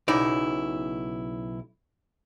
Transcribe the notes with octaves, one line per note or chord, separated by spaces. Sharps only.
B1 C#3 D#4 E4 D5